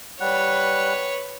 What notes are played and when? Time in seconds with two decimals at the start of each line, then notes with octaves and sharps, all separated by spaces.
0.20 G3 B4 C#5 F#5